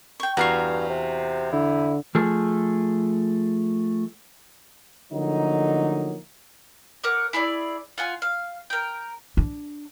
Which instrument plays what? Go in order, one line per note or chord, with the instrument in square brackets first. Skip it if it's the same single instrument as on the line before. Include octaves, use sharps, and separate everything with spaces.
[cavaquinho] G5 C#6
[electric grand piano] E2 A#5 C7 [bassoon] G2 [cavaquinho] F#4 F5 C#6
[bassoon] C3
[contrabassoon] D3 [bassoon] E4
[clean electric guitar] F3 A3 G#4
[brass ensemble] D3 F3 F#3 A3 A#3 D#4
[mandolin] A#4 C#5 F#5 D6
E4 G#4 C5 D5
F4 F#5 G#5
F5
A#4 G5
[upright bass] D4